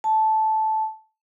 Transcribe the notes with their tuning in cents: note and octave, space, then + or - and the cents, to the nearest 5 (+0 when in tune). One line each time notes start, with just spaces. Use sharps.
A5 -10